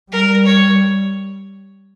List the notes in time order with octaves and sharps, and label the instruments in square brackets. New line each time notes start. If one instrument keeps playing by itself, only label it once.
[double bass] G3 [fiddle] A#4
[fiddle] C#5